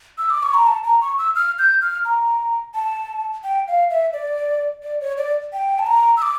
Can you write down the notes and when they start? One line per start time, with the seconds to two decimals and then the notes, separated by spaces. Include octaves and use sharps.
0.18 E6
0.30 D6
0.43 C#6
0.54 A#5
0.67 A5
0.84 A#5
1.02 C#6
1.18 E6
1.35 F6
1.59 G6
1.81 F6
2.05 A#5
2.74 A5
3.44 G5
3.68 F5
3.90 E5
4.13 D5
4.83 D5
5.01 C#5
5.18 D5
5.53 G5
5.79 A5
5.86 A#5
6.17 E6
6.22 D6